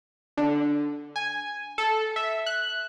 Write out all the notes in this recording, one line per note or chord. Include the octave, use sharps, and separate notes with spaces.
D3
G#5
A4
E5
F#6